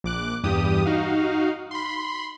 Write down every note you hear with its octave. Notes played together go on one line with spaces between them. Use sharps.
A#1 D6 F#6
E2 G2 G4 D#6
D#4 F#4 F5
B5 C6